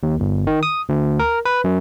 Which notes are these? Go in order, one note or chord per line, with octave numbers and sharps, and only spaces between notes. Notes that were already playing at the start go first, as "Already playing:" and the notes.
D#2
G1
D#3
D#6
D2
A#4
B4
F#2